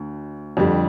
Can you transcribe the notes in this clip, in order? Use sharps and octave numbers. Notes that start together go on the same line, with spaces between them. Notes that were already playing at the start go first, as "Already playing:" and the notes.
Already playing: D2 D3
F2 D3 G3